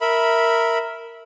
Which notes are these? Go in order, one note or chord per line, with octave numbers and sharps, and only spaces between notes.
A#4 E5 B5